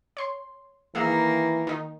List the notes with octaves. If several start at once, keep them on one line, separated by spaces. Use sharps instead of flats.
C#5 C6
D#3 E3 A#3 G#4 E5 F5
D#3 D#4